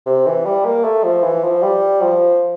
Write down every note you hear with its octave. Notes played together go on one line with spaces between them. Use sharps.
C3
E3
G3
A#3
A3
F3
E3
F3
G3
F3